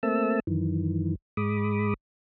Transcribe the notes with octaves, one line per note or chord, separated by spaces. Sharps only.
A3 A#3 C4 E5 A5 E6
F#2 D#3 E3
G#2 G#3 B5 D6 D#6